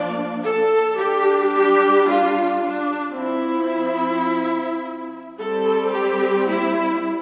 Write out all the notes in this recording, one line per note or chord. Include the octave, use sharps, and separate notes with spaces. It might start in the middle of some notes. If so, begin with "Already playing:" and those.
Already playing: F3 A#3 D4 D5
A4
G3 D4 G4
G4
F4
D4
F3 C4 E4
G3 C4 A4
G4
E4